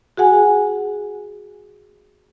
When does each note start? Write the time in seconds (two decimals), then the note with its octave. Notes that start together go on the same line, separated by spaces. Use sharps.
0.17 F#4 G#4 F#5 G#5